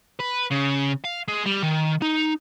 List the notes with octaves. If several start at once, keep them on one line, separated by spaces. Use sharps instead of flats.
B4
C#3
F5
G#3
G3
D#3
D#4